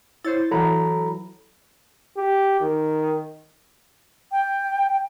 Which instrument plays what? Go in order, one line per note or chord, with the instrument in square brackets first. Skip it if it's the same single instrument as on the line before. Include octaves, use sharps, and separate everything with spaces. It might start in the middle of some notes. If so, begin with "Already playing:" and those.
[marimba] E4 [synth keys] C5 C#5 A6
[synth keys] E3 F#3 [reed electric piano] A4 A#5 B5
[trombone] G4
D#3
[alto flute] G5